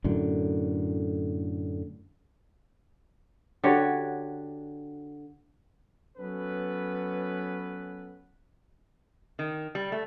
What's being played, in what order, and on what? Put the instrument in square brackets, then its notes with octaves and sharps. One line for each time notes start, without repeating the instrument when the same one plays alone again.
[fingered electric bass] F#2 A2 D3
[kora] D3 F#4 G4 C#5
[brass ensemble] F#3 B3 C#4 A4 B4
[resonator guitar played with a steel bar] D#3
G3
A3